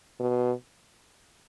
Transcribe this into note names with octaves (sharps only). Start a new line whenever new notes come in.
B2